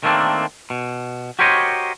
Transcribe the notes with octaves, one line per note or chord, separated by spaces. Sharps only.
D#3 A3 A#3 C4 D4
B2
F#4 G4 A#4 C5 C#5 D#5